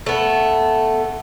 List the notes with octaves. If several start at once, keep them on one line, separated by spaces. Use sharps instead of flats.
A3 B3